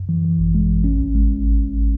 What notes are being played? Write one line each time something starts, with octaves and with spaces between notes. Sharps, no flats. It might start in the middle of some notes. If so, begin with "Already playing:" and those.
Already playing: F#2
E3
E3
G#1
G#3
G#1
C#4
A1
G#3